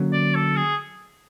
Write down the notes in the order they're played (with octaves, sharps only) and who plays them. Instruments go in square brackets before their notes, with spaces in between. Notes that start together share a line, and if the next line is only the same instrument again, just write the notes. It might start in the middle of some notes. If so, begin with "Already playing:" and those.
Already playing: [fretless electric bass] D3 F#3 A#3 C#4
[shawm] D5
A4
G#4